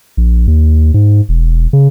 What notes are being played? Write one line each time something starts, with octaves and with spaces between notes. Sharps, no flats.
A#1
D#2
G#2
E1
C#3